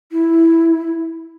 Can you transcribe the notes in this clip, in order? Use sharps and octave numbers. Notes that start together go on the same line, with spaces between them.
E4